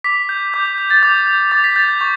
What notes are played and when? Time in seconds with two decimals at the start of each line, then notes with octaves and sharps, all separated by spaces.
0.04 D6 B6
0.29 G6
0.54 D6 G6
0.66 G6
0.78 G6
0.90 A6
1.03 D6 G6
1.27 G6
1.51 D6 A6
1.64 B6
1.76 G6 A6
1.88 G6
2.01 C#6 A6